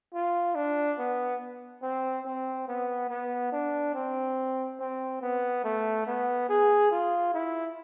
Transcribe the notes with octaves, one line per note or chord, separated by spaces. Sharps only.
F4
D4
B3
C4
C4
B3
B3
D4
C4
C4
B3
A3
B3
G#4
F4
E4